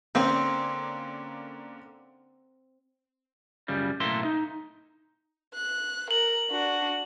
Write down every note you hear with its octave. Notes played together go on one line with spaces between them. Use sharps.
D3 A#3 C4 C#4
C#2 F#2 C#3 G3
B1 A2 A#3 A4 E5 C6
D#4
F#6
A#4 F#7
D4 F#4